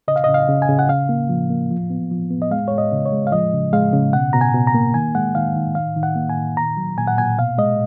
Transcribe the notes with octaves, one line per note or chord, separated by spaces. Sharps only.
C#3 D#5
F5
C#3 D#5
F5
C#3
G#5
C#3
F#5
C#3 F5
A#3
F3
A#3
F3
B3
F3
B3
D#5
G#3 F5
G#3 C#5
D#5
C#3
C#5
G#3
F5
F3 D#5
C#3
G#3 F5
C#3
B2 F#5
B2 A#5
G#5
B2
A#5
A#3
D#3 G#5
G#3 F#5
D#3 F5
D#3
D#3 F5
D#3
F#5
A#3
G#5
D#3
A#2 A#5
F#3
A#2 G#5
F#5
A#2 G#5
B2 F5
G#3 D#5